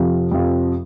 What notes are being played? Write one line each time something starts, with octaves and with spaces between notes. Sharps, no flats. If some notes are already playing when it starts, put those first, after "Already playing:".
Already playing: F2 C3 F3
F2 C3 F3